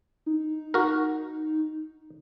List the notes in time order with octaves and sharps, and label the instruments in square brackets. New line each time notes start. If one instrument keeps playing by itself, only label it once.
[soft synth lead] D#4
[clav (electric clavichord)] F#4 A#4